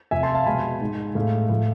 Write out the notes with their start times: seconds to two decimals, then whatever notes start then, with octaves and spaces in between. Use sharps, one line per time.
0.11 F2 C3 F3 E5 G#5
0.23 A5 C6
0.35 F5 A5
0.46 B2 G#3 G#5 B5
0.81 G#2 G#3
1.15 A2 G#3 F5
1.50 A2 F3 G#3